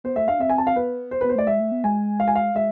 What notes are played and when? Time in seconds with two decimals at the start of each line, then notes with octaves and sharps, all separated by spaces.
0.04 B3 C5
0.16 A3 E5
0.28 D4 F5
0.40 C4 E5
0.49 G#5
0.58 A5
0.67 F5
0.76 B3 B4
1.11 C5
1.21 B4
1.24 B3
1.29 C5
1.35 A3 D5
1.47 G#3 E5
1.60 A3
1.72 B3
1.84 G#3 G#5
2.20 F5
2.28 G#5
2.35 F5
2.55 G#3 E5